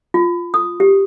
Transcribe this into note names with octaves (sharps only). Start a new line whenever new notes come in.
F4
D#6
G4